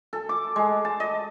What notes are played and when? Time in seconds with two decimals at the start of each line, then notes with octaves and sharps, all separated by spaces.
0.13 A4
0.29 D6
0.56 G#3
0.85 A5
1.00 D#5